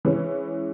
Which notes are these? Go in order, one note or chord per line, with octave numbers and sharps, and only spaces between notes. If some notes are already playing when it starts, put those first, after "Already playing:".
E3 G#3 C#4 B4